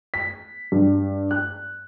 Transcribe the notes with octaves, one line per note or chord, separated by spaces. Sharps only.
B6
G2
F#6